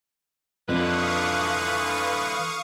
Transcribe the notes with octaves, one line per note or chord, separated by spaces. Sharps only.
F2 D3 E3 D4 B4 F5 C#6 D#6